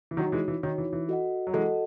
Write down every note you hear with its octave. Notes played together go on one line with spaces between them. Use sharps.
E3
D#3 F#3 D#4 F#4 C#5
E3 G#3
E3
D#3 D#4 F#4 C#5
E3
E3
F#4 A4 D#5 F#5
F#3
E3 G#3 F#4 A4 D#5 F#5